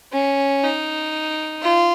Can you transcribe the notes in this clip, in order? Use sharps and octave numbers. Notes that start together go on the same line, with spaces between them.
C#4
D#4
F4